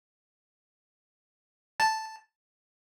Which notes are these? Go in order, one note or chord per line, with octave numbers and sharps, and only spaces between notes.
A5